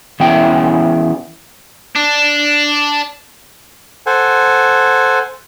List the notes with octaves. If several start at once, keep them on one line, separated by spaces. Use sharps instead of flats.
E3 B3 C#4 E4 F#4 G5
D4
A4 C5 F#5 G#5